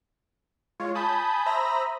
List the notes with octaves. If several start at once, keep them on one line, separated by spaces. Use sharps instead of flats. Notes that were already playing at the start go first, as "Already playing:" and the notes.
G#3 F4 C#5
G#5 A5 B5 D#6 G6
C5 E5 A#5 B5 D#6 A#6